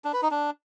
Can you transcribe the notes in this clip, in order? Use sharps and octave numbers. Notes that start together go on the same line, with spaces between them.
D4
B4
D#4
D4